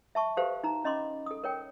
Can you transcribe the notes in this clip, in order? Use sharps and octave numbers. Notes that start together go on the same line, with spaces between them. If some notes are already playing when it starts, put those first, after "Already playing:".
E5 A5 C#6
F#4 G4 A4 B4 C5 F5
D#4 A#5
C#4 D#5 B5 C6 D6
A4 D#6
A#4 C#5 G5